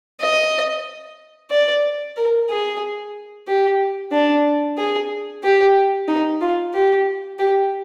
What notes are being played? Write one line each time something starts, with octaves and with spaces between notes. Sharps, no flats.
D#5
D5
A#4
G#4
G4
D4
G#4
G4
D#4
F4
G4
G4